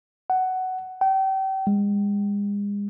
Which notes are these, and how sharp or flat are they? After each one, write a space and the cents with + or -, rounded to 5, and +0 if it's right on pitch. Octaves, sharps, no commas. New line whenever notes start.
F#5 +10
G5 -35
G#3 -40